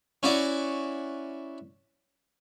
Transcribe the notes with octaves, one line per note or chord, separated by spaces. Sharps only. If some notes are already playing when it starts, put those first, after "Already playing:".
C#4 E4 F#4 D5